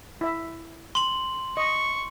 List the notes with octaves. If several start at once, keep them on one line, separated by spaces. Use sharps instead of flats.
E4 E5
C6 F#7
D#5 C#6